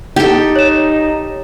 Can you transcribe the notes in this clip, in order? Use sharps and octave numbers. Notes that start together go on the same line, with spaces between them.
D#4 G4 A4
C#5 E7